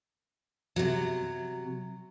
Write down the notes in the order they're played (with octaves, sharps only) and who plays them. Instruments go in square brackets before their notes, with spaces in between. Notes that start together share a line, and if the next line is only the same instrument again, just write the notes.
[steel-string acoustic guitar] C3 F#3